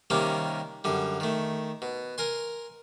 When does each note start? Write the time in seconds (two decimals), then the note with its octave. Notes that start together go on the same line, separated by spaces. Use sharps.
0.10 C3 D#3 G3 A#3 C#4
0.84 F#2 D3 G3
1.20 D#3 A3
1.82 B2
2.18 A#4 G#5 C6